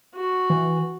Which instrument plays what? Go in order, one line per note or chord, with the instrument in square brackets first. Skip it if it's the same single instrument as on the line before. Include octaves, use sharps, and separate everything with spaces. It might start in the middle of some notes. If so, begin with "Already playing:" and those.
[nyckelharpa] F#4
[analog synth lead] E3